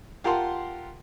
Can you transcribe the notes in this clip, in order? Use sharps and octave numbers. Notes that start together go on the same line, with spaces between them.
F4 G4 A#4 F#5 A5 C6